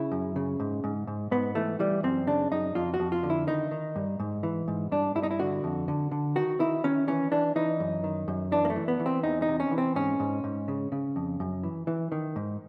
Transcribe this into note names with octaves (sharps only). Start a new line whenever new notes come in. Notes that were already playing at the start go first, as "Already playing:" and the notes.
Already playing: C#3 E4
F#2
C#3
G#2
G#2
G#2
G#2 B3
E3 A3
E3 G3
F#2 C4
C#3 D4
F#2 D#4
F2 F4
F#4
F2
F4
D3
E4
D#3 D#4
D#3
G2
G#2
E3
G#2
G2 D4
G2 E4
D#4
E4
D3 F#4
F2
D3
D3
D#3 F#4
D#3 E4
D#3 C#4
E3 C#4
E3 D4
E3 D#4
F#2
D#3
F#2
E3 D4
A#3
A3
E3
B3
E3
C4
E2 D#4
D#4
C3
C#4
E3
C4
G#2 C#4
G#2
G#2
C#3
C#3
F2
F#2
E3
E3
D#3
G#2